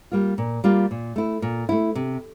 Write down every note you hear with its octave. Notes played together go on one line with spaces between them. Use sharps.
G3 A#3 F4
A#2
G3 A#3 F4
A#2
A3 E4
A#2
A3 E4
C3